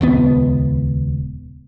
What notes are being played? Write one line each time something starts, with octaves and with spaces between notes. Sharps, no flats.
D#1 C#2 B3